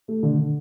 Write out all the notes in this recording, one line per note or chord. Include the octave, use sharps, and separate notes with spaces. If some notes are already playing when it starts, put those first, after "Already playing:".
A3
D3
D3